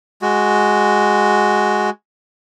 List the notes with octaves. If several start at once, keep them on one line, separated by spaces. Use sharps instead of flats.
G#3 F#4